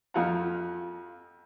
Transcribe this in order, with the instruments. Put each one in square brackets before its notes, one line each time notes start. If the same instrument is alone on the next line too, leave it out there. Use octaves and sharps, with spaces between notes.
[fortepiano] F2 F3 F4 F5 F#5 A#5